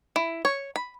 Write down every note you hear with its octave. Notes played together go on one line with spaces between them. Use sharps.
E4
C#5
B5